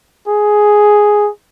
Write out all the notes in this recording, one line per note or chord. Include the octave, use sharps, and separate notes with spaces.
G#4